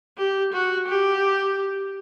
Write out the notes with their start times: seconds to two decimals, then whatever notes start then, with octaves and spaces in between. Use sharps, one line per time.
0.18 G4
0.53 F#4
0.88 G4